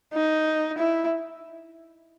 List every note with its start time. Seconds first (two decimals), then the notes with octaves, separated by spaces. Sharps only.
0.14 D#4
0.78 E4